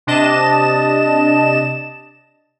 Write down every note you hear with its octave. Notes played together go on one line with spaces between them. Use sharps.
C3 D4 D#5 A5 E7